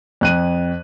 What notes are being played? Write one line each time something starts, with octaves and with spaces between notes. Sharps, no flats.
F2 F#6 D#7